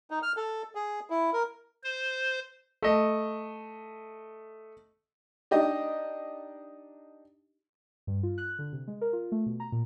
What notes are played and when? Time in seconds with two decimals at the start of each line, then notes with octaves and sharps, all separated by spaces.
0.11 D#4
0.23 F6
0.37 A4
0.75 G#4
1.10 E4
1.33 A#4
1.84 C5
2.83 A3 D#5
5.51 D4 D#4 G4 D#5
8.07 G2
8.23 F4
8.38 F#6
8.59 D3
8.73 C3
8.87 G#3
9.01 A#4
9.13 F4
9.32 A3
9.46 B2
9.60 A#5
9.72 A#2